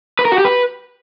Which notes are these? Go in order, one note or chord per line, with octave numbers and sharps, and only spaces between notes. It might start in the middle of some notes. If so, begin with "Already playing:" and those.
B4
A#4
F#4
G4
B4